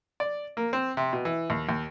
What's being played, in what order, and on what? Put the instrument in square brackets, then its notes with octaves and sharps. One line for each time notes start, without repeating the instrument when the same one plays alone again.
[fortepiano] D5
A#3
C4
C3
B2
E3
D#2
D#2